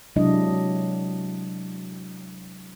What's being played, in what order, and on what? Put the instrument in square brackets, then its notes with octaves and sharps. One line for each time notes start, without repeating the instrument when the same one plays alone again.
[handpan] C3 F#3 G#3 D4 E4 D#5